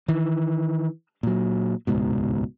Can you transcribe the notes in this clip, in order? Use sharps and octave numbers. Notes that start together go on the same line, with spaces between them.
D#3 E3
A#2 F#3
D#1 C#2 G#2 B2